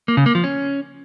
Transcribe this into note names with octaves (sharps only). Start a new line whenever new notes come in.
A#3
C#3
A#3
F3
C#4